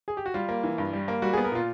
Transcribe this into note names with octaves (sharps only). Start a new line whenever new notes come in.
G#4
G4
F#4
G3 F4
A#3
E3
G2
G3
A#3
G3 F#4
B3 G#4
A#4
A#2 F4